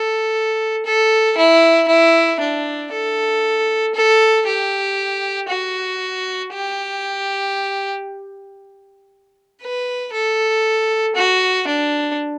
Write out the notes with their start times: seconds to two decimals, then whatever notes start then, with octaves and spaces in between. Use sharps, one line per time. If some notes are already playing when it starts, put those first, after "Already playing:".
Already playing: A4
0.86 A4
1.37 E4
1.88 E4
2.40 D4
2.93 A4
3.95 A4
4.47 G4
5.49 F#4
6.53 G4
9.62 B4
10.13 A4
11.16 F#4
11.68 D4